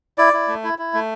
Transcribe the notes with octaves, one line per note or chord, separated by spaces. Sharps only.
E4 D5
E4
A3
E4
E4
A3